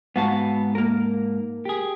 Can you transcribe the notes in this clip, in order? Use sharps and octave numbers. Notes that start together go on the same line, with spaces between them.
G#2 B3 F#4 F5 A5
A#3 A#4
G4 G#4